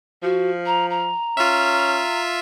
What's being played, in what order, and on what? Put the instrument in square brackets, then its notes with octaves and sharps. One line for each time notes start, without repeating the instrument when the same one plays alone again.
[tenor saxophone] F3 [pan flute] F#4
[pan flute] A#5
A#5
[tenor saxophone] C#4 [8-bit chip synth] F4 E5